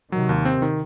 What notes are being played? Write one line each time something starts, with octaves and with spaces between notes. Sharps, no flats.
C3 D#3 F#3
D#2
C4
D#3